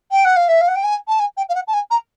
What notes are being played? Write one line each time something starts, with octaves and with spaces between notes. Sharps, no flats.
G5
F#5
F5
E5
F5
F#5
G5
G#5
A5
G#5
G5
F5
F#5
A5
G#5
A#5